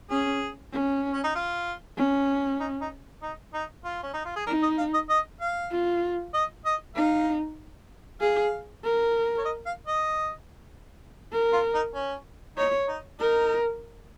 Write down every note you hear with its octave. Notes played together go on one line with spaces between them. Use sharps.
C#4 G#4
C#4
C#4
D#4
F4
C#4
D#4
D#4
D#4
D#4
F4
C#4
D#4
F4
G#4
D#4 A#4
D#5
F5
D#5
D#5
F5
F4
D#5
D#5
D#4 F5
G#4 F5
A#4
C#5
D#5
F5
D#5
A#4
F4
D#4
C#4
D#4 C#5
D#4
D#4 A#4